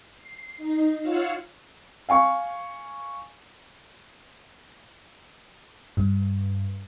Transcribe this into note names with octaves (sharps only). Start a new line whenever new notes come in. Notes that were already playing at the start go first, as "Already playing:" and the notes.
C7
D#4
F4 C#5 F5 F#5 E6
F5 G#5 C#6
G2